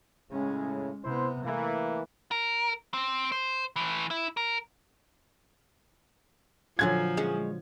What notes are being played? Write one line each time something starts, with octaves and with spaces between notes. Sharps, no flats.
A2 C#3 G#3 C#4
C3 B3 E4 C5
E3 A3 A#3
A#4
C4
C5
E3 A3
E4
A#4
A#2 D3 F3 F#3 G#5 G#6
G#3 C#4